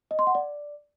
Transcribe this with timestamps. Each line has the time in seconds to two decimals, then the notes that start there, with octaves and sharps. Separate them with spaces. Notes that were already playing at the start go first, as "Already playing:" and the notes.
0.11 D#5
0.19 C6
0.27 F#5
0.35 D5